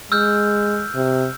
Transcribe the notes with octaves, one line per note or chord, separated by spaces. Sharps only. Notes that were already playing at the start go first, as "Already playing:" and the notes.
G#3 E6 F6 G6
C3